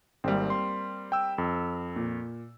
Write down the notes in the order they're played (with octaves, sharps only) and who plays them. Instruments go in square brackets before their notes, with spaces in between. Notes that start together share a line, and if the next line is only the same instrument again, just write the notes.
[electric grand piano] G#1 [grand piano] G3 A#3 C4
[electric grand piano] C6
G5 E6
F2
[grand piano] A#2